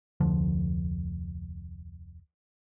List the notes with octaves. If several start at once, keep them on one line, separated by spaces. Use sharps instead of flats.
F1 D2 D3 F3